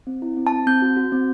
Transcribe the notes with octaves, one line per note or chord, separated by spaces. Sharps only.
C4
E4
C4
A5
C4
C4 G6
F#4
F#4
C4